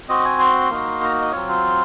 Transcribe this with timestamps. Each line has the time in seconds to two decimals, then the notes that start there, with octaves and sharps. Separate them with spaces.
0.09 C4 F#4 D#5
0.25 G#5
0.39 C6
0.70 A#3 D#4 F#4
1.02 A#5
1.22 D#5
1.32 F#3 C4 F4 C#5
1.48 C5